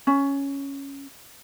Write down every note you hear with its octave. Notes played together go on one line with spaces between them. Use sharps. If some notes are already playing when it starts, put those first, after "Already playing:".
C#4